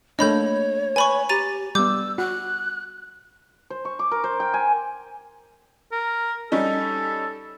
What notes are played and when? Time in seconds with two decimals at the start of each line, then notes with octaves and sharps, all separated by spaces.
0.19 A3 A#3 D4 C#5 D#5 B5 G6
0.96 B4 G#5 B5 C#6
1.29 G4 A#5 A6 D#7
1.75 G3 B3 D6 E6 G6
2.18 F#4 F#6
3.70 C5
3.85 C#6
3.99 D6
4.11 A#4
4.24 C5
4.40 G5
4.54 G#5
5.92 A#4
6.52 G3 C#4 D#4 A4